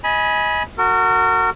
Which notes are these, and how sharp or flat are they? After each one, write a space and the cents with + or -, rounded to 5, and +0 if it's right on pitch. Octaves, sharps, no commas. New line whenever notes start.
D#5 +20 G#5 +5 B5 -20
F#4 +0 A#4 -35